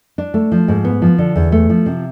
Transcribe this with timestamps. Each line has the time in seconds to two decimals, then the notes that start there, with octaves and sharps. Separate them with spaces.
0.18 D4
0.34 A3
0.52 F3
0.68 G#2
0.84 B3
1.02 F3
1.18 D3
1.36 E2
1.52 A3
1.69 F3
1.86 C3